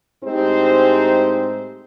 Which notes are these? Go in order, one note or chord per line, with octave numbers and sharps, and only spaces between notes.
A2 G#3 C4 D#4 G4 C5